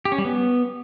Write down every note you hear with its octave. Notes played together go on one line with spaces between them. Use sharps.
G4
C#4
G3
B3